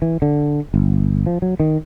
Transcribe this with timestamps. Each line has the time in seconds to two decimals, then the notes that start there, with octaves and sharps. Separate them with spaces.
0.02 E3
0.22 D3
0.74 G1
1.26 F3
1.42 F#3
1.60 D#3